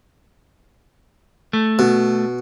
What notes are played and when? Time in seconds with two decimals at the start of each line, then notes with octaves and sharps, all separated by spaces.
1.53 A3
1.79 B2